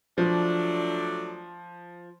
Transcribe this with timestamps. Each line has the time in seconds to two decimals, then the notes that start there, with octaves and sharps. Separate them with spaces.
0.18 F3 F#3 A3 D4